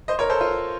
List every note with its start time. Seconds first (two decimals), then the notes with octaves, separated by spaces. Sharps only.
0.08 C5 D#5
0.19 A#4 C#5
0.30 A4 C5
0.41 F4